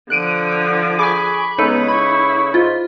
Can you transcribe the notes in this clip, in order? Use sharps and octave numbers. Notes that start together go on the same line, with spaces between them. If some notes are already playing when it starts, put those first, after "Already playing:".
D3 F3 F#6 D7 D#7
G#4 G#5 B5 C#6 D6
C#3 G#3 B3 D#4 A4 B4
E4 B5 C#6
G#2 F4